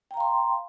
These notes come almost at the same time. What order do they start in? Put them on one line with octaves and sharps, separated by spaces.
G5 A#5 F5 C6